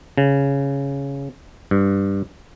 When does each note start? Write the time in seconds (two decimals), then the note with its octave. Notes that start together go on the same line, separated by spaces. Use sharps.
0.18 C#3
1.71 G2